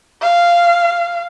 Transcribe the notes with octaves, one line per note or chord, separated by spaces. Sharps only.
F5